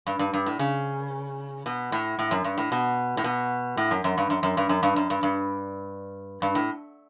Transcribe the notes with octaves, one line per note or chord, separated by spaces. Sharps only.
G2
G2
G2
A2
C#3
B2
A2
A2
F#2
G2
A2
B2
A2
B2
A2
F#2
F#2
G2
F#2
F#2
G2
F#2
G2
F#2
G2
G2
G2
A2